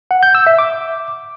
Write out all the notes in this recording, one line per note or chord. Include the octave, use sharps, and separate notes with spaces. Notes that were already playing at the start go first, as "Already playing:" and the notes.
F#5
G6
E6
E5
D6